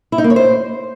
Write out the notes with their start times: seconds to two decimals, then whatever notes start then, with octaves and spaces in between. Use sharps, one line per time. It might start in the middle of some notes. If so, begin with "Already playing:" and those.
0.12 E4
0.18 D#4
0.24 A#3
0.30 C#5
0.36 C5